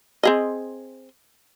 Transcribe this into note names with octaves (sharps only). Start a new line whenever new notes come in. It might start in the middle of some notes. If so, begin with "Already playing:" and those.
C4 G#4 D#5